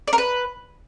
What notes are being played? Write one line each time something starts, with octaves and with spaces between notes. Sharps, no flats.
D5
A#4
B4